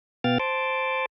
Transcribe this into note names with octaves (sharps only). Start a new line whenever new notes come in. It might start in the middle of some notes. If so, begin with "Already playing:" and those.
B2 B3 F5 G5 F6 A6
C5 A5 C6 D6